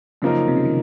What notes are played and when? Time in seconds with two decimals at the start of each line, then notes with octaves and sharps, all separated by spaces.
0.22 F#2 C#3 F3 A#3 D#4 A#4
0.48 C3
0.56 C#3
0.65 D#3